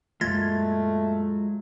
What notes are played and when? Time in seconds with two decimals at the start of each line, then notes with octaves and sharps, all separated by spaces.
0.21 F#2 A#2 F#3 G#3 A3 F4 G#6 A6